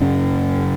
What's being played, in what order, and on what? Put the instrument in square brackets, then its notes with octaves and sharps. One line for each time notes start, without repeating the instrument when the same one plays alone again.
[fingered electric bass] F#2 C#3 C#4